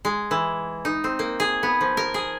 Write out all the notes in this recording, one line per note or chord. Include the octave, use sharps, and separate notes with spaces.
G#3
E3
D#4
C4
A#3
G#4
B3
F3
A#4
G#4